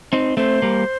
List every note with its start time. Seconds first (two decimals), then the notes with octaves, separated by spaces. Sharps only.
0.13 C4 D#4
0.37 A3 C4 C5
0.62 G3 A#3